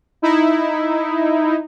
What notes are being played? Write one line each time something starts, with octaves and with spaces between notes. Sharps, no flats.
D#4 E4